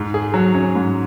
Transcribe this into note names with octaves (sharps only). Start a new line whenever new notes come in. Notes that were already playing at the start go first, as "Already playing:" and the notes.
Already playing: G#2
G#4
F#3
C#4
G#2